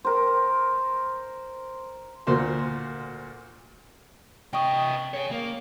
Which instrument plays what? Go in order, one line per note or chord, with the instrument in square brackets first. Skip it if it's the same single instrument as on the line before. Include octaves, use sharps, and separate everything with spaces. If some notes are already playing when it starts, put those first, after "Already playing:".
[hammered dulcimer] A#4 C5
[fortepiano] D2 A#2 A#3 F#4 C5 C6
[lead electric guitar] C3 D#5 [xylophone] G5 C#6 D#6
[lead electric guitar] G#4 C#5
A#3